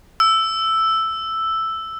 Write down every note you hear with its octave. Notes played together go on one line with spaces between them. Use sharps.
E6